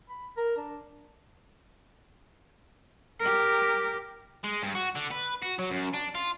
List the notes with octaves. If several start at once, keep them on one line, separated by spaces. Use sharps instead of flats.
B5
A#4
D4
G4 A#4
G#3
G2
F#4
D3
B4
F#4
F#3
F#2
D4
F4